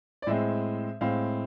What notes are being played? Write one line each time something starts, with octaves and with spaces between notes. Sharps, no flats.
D5
A2 G#3 C4 E5
A2 G#3 C4 F5